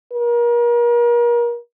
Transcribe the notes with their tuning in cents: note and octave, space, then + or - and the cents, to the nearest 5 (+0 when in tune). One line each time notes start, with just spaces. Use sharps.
A#4 +35